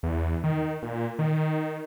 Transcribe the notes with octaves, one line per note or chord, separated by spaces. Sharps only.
E2
D#3
A#2
D#3